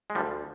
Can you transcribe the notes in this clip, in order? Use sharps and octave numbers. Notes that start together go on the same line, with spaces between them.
G#3
D2 D3 F3 G3